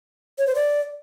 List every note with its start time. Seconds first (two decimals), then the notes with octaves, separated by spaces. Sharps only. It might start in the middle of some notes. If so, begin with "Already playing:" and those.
0.38 C#5
0.47 C5
0.55 D5